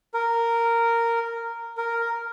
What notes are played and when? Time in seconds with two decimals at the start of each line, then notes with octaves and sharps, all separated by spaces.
0.14 A#4
1.77 A#4